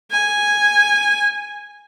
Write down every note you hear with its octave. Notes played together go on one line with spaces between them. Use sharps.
G#5